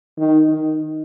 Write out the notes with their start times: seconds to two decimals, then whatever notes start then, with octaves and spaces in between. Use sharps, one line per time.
0.18 D#3
0.49 D#3